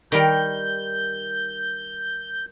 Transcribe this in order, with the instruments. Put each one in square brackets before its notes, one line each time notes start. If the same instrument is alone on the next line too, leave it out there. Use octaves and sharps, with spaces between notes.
[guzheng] D#3 G3 A#4 [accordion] G6